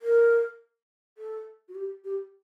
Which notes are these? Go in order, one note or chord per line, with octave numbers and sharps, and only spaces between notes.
A#4
A4
F#4
G4
G4